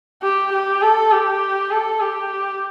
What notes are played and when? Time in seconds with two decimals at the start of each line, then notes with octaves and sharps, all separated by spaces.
0.22 G4
0.53 G4
0.82 A4
1.12 G4
1.71 A4
2.01 G4